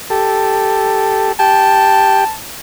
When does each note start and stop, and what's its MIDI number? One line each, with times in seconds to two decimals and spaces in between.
0.10 1.32 67
0.10 1.32 69
1.39 2.24 67
1.39 2.24 79
1.39 2.34 81